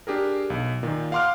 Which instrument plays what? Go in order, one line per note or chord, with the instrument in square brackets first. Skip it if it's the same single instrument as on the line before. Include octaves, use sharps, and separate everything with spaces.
[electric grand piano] D4 G4 G#4 A#4
B1
A#2 D#3
F5 F#5 C6 D6 F6